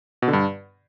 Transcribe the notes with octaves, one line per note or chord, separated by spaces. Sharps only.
B2
D3
G2